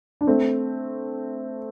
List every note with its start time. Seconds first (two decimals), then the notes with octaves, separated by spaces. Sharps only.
0.21 D4
0.27 A3 C4